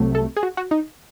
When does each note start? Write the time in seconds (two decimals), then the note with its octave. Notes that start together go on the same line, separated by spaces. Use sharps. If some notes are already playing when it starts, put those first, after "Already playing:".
Already playing: C2 C3 F#3 A3
0.15 A4
0.37 G#4
0.43 F#4
0.57 F#4
0.71 D#4